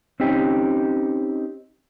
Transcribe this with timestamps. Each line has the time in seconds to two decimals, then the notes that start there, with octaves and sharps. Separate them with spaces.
0.20 C4 C#4 D#4 G4